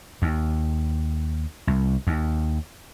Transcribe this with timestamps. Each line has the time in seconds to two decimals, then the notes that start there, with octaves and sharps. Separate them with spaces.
0.22 D#2
1.67 C2
2.07 D#2